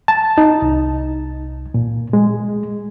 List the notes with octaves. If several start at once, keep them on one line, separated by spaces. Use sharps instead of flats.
A5
D#4
C2
A#2
G#3